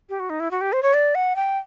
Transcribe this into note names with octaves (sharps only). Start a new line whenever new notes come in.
G4
F#4
D#4
E4
F#4
G4
C5
C#5
D5
F#5
G5